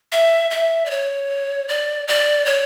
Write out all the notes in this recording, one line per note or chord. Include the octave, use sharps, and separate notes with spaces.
E5
E5
D5
C#5
D5
D5
C#5